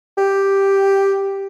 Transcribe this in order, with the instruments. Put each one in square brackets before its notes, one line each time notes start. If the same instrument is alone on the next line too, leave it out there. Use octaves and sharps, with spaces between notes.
[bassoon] G4